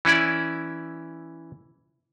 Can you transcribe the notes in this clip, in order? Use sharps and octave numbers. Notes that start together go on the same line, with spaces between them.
E3 C#4 E4 D5